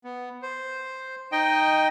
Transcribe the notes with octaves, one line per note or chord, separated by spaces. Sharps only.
B3
C5
D#4 D#5 G5